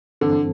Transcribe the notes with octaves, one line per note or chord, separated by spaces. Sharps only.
G2 D3 E3 C4 A4